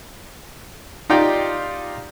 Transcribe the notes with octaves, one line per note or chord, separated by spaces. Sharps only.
D#4 F4 G4 D5 G5 A#5